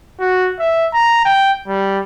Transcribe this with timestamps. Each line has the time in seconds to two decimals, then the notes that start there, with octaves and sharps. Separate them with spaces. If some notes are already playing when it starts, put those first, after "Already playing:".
0.20 F#4
0.59 E5
0.94 A#5
1.25 G5
1.68 G3